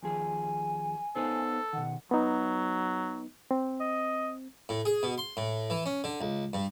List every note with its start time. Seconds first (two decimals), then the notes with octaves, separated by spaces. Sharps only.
0.03 D#2 F3 G#4 G#5
1.16 B3 D#4 A4 C5
1.73 B2 D#3 F#5
2.11 F#3 B3 D#4
3.51 C4
3.80 D#5
4.69 A2
4.85 G#4
5.03 B2
5.18 C6
5.37 A2
5.70 E3
5.86 C#4
6.04 D3
6.21 C#2
6.53 G2